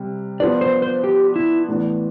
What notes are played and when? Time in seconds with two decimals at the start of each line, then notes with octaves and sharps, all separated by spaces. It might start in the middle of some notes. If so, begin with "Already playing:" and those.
Already playing: C3 G3
0.40 F3 B3 D4 D5
0.61 C5
0.82 C5
1.04 G4
1.36 E4
1.68 A2 E3 B3 D4